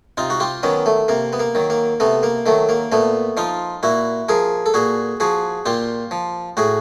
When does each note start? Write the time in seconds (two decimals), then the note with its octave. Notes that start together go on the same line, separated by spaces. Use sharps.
0.17 C3 D#4 F4
0.30 F#4
0.40 F4 G4
0.63 D#3 F#3 B3 C#4
0.86 A3
1.08 C3 A#3
1.33 B3
1.40 A#3
1.55 D#3 F#3
1.70 A#3
2.00 C3 A3 B3
2.23 A#3
2.46 D#3 F#3 A3
2.69 A#3
2.92 A#2 A3 B3
3.37 F3 D#4 F4
3.83 A#2 E4 F#4
4.29 F3 G#4 A#4
4.66 A4
4.74 A#2 F#4 G#4
5.20 F3 F#4 G#4
5.66 A#2 F4 G4
6.11 F3
6.57 A2 F#4 G#4